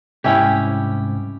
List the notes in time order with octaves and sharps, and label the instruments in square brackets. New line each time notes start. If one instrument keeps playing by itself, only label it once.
[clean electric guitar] C2 G#2 G5 [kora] C#4 E4 G4